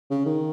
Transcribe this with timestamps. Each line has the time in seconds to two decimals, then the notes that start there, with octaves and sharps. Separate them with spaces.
0.10 C#3
0.26 D#3